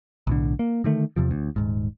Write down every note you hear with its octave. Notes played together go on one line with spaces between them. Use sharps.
B1 A2 D3
A#3
D3 D#3 A3
E2 C3 F3
D2
D#1 D#2 G#2